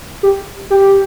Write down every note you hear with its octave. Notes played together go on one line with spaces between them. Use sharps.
G4
G4